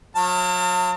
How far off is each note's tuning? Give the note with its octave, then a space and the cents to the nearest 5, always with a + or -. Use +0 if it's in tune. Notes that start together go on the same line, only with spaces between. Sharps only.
F#3 -30 F5 +0 A5 +45